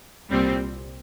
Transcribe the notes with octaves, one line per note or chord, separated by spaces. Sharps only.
C2 A#2 G3 C4